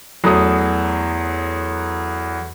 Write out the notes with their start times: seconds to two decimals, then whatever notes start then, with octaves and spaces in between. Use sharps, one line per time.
0.24 E2 F#3 A3 D#6